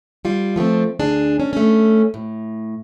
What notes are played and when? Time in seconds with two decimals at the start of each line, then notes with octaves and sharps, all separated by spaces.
0.25 G3 F4
0.56 F3 A3 B3 C4
0.99 D2 D4 G#4
1.40 C#4
1.53 A3 C#4
2.14 A2